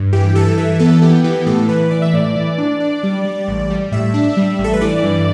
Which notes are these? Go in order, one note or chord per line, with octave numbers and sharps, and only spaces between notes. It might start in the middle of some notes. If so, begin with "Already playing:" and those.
Already playing: G2
E3 G4
E3 A4
E3 E5
B3 A4
B3 G4
E3 G4
A2 A4
E3 B4
E3 D5
E5
A2 D5
E3
D4
D4
G3
G3
A1
G3
A2 E5
D4
G3
A1
A4
B4
E3 D5
G2